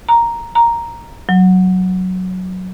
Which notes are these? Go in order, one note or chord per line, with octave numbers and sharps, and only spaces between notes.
A#5
A#5
F#3